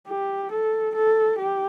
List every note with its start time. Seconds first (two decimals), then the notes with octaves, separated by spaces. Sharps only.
0.08 G4
0.52 A4
0.95 A4
1.39 G4